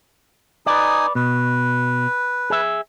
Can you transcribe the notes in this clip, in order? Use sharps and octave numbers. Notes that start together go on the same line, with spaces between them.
D#4 B4 D5 G#5 D#6
B2 B4
G#4 E5